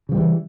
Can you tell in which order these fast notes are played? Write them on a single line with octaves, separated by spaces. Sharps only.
C#3 F3 G3 E3